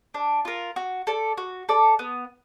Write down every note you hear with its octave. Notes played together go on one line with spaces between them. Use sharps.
D4
F4 A#4
F#4
A4 D5
F#4
A4 D5
B3